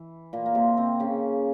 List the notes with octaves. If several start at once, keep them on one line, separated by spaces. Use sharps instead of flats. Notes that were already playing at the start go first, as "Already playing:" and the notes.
Already playing: E3
A#2 A#3
A#3
C3 C4
C3 C4
C#3 C#4